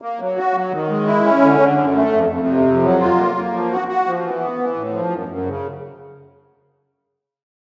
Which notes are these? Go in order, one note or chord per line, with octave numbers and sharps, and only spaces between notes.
A#3
F#3
F#4
F#3
D#3
G#3
E4
C#4
D3
D3
F#2
A3
F2
F2
C3
F2
F#3
F4
A#3
A#3
F3
F#4
F#4
F3
E3
B3
E3
A2
F3
F#2
F#2
C#3